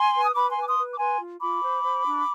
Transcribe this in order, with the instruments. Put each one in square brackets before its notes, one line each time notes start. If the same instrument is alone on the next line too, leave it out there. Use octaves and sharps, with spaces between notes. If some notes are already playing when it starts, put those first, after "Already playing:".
Already playing: [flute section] G#5 C6
B4
D#6
B4 B5 D6
G#5 C6
B4 D6
C6 D#6
B4
D6
B4 G#5 C6
F4
F4 B5 D6
C5
C5
D4